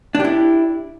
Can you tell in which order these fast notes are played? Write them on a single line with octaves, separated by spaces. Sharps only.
D4 G4 E4